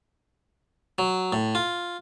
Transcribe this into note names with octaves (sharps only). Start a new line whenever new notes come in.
F#3
A2
F4